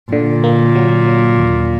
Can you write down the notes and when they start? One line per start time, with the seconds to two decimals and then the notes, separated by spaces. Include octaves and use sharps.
0.12 A#2 D3
0.44 A#3
0.75 F#3
1.06 F#3
1.37 D#2